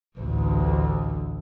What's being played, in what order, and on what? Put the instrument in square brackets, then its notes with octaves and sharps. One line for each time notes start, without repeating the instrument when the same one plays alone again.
[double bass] A1 D2